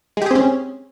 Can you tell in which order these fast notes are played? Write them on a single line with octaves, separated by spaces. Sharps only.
G#3 G4 G#4 C4 C#4